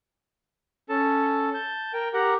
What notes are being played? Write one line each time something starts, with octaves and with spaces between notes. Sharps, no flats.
C#4 A4 A5
A5 G6
A#4 G5
G4 A#4 F#5 A#5